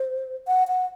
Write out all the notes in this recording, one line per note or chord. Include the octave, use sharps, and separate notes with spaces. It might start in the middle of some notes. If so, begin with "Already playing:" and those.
Already playing: C5
F#5
F#5